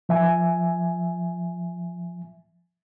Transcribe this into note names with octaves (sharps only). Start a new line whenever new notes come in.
F3 E5 G#5